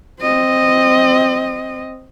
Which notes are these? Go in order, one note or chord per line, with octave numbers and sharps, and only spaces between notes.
C4 D#5